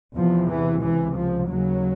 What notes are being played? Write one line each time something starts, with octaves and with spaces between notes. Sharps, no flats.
E2 C3 F3
E3
C#2 C3 E3
F3
D#2 C#3 F#3